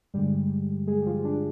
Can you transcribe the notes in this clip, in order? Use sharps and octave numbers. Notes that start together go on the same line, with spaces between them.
G2 D3 G3 G#3 G4
G#3 G#4
G4
F3 F4
D4